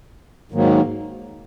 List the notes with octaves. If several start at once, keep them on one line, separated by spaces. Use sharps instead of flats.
G#2 D#3 F#3 A#3